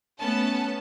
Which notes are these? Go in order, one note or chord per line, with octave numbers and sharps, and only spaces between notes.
A3 B3 C#4 A5